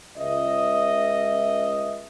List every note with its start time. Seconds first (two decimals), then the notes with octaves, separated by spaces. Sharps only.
0.17 C#2 D#5 E5